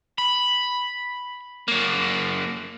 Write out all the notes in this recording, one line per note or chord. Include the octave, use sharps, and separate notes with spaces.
B5
F#2 A#3